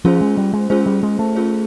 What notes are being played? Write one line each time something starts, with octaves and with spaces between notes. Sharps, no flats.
F3 C#4 F4 G#4 C5
G#3
G3
G#3
G#3 C#4 F4 G#4 C5
G3
G#3
A3
C#4 F4 G#4 C5